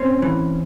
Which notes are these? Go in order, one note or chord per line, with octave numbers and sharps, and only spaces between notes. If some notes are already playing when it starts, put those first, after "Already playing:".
Already playing: A2 C4 C#4
E3